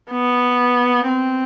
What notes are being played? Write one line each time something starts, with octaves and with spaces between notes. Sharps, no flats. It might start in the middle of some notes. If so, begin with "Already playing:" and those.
B3
C4